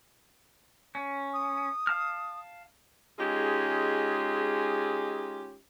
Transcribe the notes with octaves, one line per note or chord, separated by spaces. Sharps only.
C#4
D#6
F5 A5 F6
G#3 C#4 D#4 F4 G4 G#4